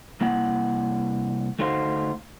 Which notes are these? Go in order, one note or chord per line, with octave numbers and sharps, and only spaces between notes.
C2 A#3 E4 F#5
D2 A3 D#4 F#4 C5 F5